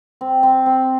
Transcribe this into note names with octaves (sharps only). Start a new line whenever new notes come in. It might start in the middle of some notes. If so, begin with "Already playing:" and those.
C4
C4
C4